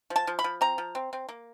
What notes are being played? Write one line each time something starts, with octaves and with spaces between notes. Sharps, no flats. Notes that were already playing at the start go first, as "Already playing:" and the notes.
F3
A5
F3
B5
F3
C4 A#5
F3
C4
C4
A#3